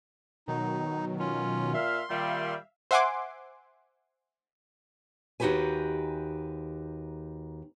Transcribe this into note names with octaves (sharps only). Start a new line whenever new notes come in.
B2 D#3 F#3 D#4
C#4 F4
A#2 E5 F5 C6
A#2 D#3 G3 E5 F5
C5 E5 F#5 G#5 C6 D6
D#2 D#4 F#4 G4 B4 G#5